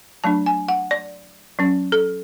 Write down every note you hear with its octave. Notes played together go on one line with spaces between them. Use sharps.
F#3 A3 D4 A5
G#5
F#5
D5
F#3 C#4
A4